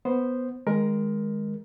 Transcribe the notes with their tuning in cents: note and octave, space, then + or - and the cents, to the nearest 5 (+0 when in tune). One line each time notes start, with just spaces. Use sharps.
B3 +0 C5 +0
D#3 +0 G#3 +0 A#4 +15